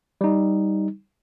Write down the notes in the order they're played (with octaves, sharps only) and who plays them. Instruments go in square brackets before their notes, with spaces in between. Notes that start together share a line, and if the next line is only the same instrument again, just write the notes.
[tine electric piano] G3 D#4